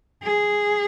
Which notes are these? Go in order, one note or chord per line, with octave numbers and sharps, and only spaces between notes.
G#4